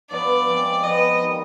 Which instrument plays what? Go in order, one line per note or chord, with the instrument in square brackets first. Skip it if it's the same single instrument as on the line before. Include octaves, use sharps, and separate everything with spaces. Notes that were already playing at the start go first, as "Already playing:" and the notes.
[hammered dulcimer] G2 F3 B3 F4 [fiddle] D5
[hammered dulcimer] F3 G#3 C4
[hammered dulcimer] F3 G#3 B3 [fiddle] D#5
[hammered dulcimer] D#3 G3